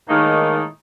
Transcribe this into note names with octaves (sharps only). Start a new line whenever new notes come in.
A2 D#3 G#3 A#3 D#4